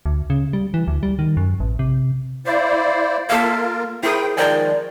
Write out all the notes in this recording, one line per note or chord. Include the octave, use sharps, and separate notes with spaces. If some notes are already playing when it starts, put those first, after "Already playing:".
D2
C#3
G3
E3
D2
G3
D#3
F#2
A1
C3
E4 C5 D5 F5
A#3 F4 A4 A#4 E5 F5
E4 G#4 A#4 C5 G5 D#6
D#3 F3 G#3 A#4 D5 G5 G#5